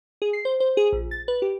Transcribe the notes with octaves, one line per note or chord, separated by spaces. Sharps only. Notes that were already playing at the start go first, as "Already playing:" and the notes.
G#4
C7
C5
C5
G#4
A#1
A6
B4
G4